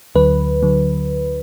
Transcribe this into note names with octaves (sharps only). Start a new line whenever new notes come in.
D2 D3 F#3 B4
D3 F#3